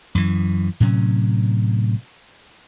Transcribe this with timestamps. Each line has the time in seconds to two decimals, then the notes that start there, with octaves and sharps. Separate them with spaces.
0.15 F#2 E3
0.80 A2 C3 F#3 C#4